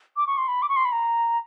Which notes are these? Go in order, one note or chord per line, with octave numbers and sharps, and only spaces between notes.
D6
C#6
C6
B5
D6
C#6
C6
B5
A#5